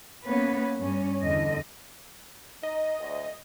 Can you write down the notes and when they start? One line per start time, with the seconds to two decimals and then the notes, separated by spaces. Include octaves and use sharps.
0.24 A#3 B3 C#4 B4
0.79 G2 C#4
1.22 E2 D3 D#5
2.63 D#4 D#5
3.00 D2